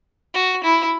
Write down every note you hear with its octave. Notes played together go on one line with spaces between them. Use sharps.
F#4
E4